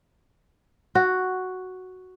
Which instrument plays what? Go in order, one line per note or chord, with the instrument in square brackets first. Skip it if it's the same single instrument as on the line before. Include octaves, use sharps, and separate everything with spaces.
[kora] F#4